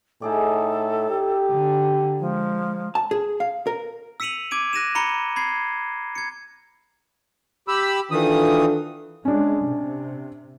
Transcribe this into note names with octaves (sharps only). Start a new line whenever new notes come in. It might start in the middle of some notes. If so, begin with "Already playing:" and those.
A2 D#4 G#4 A4 D5
G4
D3
F3 G#3
A5
G#4
F5
A#4
E6 B6 C#7 D#7 F7 F#7
D6 G#6 D7 D#7
F#6 A#6 D#7 E7
A#5 B5 C#7 G7
B5 G#6 C7
G#6 C#7
G4 B5 E6
D#3 E3 D4 F4 A4 D#6
G#3 C#4 D4
C3